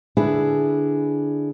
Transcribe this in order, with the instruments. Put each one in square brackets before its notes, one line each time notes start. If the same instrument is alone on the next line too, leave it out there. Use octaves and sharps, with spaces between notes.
[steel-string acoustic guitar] D3 B3 D4 E4 G#4